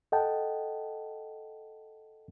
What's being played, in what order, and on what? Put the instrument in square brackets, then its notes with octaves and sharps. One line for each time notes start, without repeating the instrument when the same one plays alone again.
[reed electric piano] A4 D#5 F#5 G5 A5